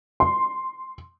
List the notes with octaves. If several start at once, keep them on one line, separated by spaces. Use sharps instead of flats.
C6